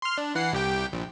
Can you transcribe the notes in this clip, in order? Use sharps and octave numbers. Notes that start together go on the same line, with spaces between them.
C6 F6
D4
E3 F#5 C7
C2 G4 G5
A#1